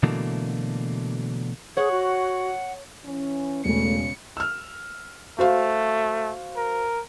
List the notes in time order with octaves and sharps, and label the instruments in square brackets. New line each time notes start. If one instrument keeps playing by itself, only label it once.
[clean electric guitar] B2 D3 E3 F#3 A3 A#3
[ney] G#4 [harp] C#5 [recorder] F#5
[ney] F#4
[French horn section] E3 C#4
[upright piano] E1 [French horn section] C#3 [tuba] A3 [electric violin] C#7
[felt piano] E6 F6
[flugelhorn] A3 [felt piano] F#4 C5 F5
[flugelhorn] A#4